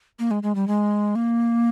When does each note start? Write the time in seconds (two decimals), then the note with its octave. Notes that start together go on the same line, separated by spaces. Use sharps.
0.19 A#3
0.31 G#3
0.43 G#3
0.55 G3
0.68 G#3
1.15 A#3